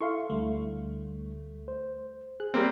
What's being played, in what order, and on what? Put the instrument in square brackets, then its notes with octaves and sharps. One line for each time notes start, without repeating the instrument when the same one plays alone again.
[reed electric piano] E4 A4 E5 [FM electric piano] F5 C6 C#6
[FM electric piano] D2 A3 [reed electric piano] D3 G3
[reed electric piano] C5
[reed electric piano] G#4 [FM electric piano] F#6
[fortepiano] G3 A#3 C4